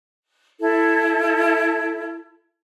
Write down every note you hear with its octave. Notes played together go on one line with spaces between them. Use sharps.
E4 A4